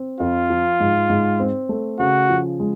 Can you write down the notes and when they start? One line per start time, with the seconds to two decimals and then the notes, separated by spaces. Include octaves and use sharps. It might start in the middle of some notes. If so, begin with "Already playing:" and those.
Already playing: C4
0.20 F2 F4
0.50 F3
0.80 G#2
1.10 G#2
1.40 C4
1.69 A3
1.99 C#3 F#4
2.30 F3
2.60 G#3